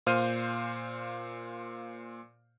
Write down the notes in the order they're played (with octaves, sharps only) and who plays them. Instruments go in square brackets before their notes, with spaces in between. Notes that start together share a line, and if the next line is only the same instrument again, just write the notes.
[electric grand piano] A#2 C5 F5 F6 G6 D#7